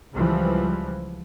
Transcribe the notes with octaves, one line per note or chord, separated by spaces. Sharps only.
C#2 E3 F3 G3